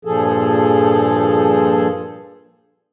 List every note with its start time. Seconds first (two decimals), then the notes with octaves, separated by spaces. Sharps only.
0.05 G2 A#2 F3 G#4 A4